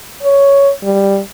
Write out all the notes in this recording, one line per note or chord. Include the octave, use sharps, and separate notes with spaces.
C#5
G3